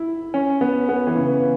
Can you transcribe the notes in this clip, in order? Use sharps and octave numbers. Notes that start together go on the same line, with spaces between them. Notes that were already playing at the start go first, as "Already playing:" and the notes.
Already playing: E4
C#4
B3
B3
E3
C#3